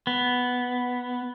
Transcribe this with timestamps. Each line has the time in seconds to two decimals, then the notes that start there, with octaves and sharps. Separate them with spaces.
0.07 B3